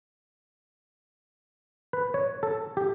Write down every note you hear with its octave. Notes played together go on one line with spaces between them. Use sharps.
B4
C#5
A4
G4